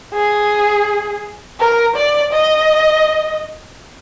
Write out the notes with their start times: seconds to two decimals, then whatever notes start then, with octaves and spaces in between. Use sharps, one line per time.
0.14 G#4
1.60 A#4
1.96 D5
2.33 D#5